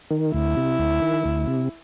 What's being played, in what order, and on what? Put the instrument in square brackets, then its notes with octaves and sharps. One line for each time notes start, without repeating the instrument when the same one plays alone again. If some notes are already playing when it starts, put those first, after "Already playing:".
[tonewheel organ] D#3
[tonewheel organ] D2 [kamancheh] E4
[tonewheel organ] C3
D2
D#3
D2
C3